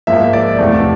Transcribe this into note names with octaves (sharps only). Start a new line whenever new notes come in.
G#2 F3 A#3 E5
D5
E2 C3 E3 A3